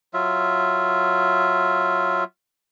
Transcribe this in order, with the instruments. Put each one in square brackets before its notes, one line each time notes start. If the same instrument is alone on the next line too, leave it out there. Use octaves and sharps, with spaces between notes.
[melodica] F#3 F4 E5